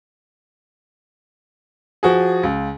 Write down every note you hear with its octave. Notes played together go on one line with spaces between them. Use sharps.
F3 F#4 G#4
C#2